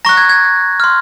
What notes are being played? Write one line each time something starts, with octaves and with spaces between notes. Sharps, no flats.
A#5 C#6 F#6 A#6
G#6
G#6
C6 F6